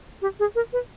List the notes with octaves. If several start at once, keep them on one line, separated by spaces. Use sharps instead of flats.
G4
G#4
A#4
B4